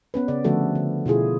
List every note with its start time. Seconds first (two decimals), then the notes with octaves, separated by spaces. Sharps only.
0.14 B3 C#4 B4
0.28 C#3 D5
0.44 D3 F3 A3 F#4 A4
0.75 D3
1.06 B2 E4 F4 G#4